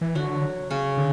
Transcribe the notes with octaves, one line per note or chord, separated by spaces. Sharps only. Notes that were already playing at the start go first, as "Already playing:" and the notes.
E3
D3 F#3 F#4
C#3 C#4
D3